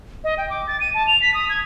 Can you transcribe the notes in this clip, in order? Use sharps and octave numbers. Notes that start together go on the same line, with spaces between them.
D#5
G5
D6
A6
D#7
A5
F7
B6
D#6
G#6